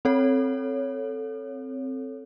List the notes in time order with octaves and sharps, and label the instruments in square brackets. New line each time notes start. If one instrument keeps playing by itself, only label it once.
[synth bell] C4 A4 C#5